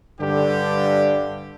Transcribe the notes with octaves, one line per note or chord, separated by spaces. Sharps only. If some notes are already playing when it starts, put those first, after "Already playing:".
G2 D3 G4